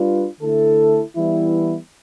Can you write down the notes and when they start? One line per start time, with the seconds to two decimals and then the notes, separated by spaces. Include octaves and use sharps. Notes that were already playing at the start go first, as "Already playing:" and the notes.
Already playing: G3 D4 F4 B4
0.41 D3 A3 E4 A4
1.15 E3 G3 B3 E4